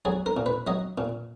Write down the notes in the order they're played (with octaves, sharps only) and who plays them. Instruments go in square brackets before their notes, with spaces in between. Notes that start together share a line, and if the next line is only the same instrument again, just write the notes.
[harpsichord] F#3 G#4
A#4
A#2
B4
F#3 D#5
A#2